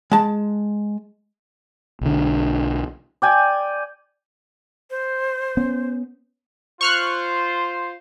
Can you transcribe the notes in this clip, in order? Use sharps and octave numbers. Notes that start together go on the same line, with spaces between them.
G#3 A5
B1 D3
D5 G5 G#5
C5
B3 C#4
F4 C5 C#6 F6 F#6